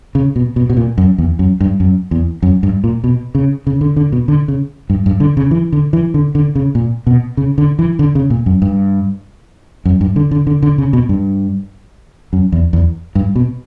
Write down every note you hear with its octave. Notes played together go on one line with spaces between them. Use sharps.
C#3
B2
B2
B2
A#2
F#2
E2
F#2
G2
F#2
E2
F#2
G2
A#2
B2
C#3
C#3
D3
D3
B2
D3
C#3
G2
G2
D3
C#3
E3
D3
E3
D3
D3
C#3
A#2
B2
C#3
D3
E3
D3
C#3
A#2
F#2
G2
F#2
G2
D3
D3
D3
D3
C#3
B2
G2
F#2
E2
E2
G2
B2